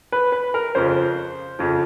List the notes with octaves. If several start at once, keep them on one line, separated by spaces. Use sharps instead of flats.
B4
B4
A#4
F2 C#3 F3 C5
F2 C#3 F3